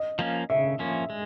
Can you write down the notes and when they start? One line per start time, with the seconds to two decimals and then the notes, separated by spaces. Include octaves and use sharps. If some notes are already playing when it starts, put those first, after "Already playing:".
Already playing: D#5
0.19 F3 A#3 C#4
0.50 C#3 E5
0.79 F3 A#3 C#4
1.10 G#3